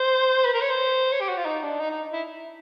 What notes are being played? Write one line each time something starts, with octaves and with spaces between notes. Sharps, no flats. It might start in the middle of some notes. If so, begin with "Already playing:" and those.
Already playing: C5
B4
A#4
C#5
C5
C#5
G4
F#4
F4
D#4
D4
D#4
D#4
E4